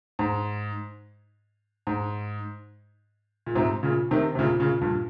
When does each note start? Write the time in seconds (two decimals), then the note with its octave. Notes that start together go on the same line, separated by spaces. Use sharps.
0.19 G#2
1.87 G#2
3.46 A#2
3.55 G#2 C3
3.83 A#2 C#3
4.11 C3 D#3
4.35 C3
4.39 A#2 C#3
4.60 A#2 C#3
4.81 G2 A#2